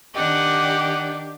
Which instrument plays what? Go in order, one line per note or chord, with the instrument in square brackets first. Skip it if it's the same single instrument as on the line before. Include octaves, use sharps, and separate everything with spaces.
[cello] D#3 D4 [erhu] G4 [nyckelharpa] D#5 F#5